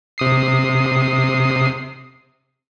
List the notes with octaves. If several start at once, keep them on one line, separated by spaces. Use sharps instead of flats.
C3 D#6 C7